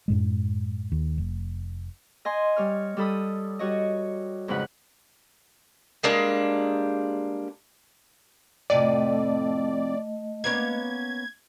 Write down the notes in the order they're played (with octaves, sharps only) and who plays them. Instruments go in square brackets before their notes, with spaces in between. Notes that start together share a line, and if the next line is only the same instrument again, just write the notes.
[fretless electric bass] F#2 A2 G#3
D#2
F1
[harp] D#5 G#5 C6
G3 C#5 F6
G3 A4 B5 D#6
G3 F#4 C#5 D#5
F2 G#2 C#3 B4 F#5
[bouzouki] G3 G#3 A#3 D4
[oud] F2 A2 C3 [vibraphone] A3 D#5 [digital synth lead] D5
[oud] A#3 B3 C#4 [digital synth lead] G#6